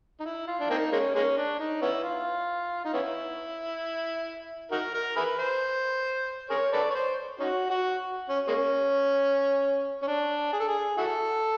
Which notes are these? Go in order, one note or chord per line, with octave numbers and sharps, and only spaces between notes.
D#4
E4
F4
D4
A#3 C4 D#4
G#3 A#3 C#4
G#3 A#3 C#4
D4
D#4
B3 C#4 E4
F4
D#4
B3 C#4 E4
D#4 F#4 A#4
A#4
E4 G#4 B4
C5
G#4 A#4 C#5
A4 B4 D5
C#5
C5
C#4 D#4 F#4
F#4
C#4
G#3 A#3 C#4
C#4
D4
G#4
A4
G#4
E4 F#4 A4